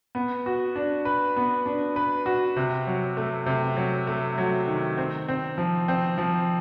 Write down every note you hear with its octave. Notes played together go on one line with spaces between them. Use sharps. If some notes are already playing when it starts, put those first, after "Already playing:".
B3
F#4
D4
B4
B3
D4
B4
F#4
C3
F#3
A3
C3
F#3
A3
F#3
D#3
C4
C4
F3
C4
F3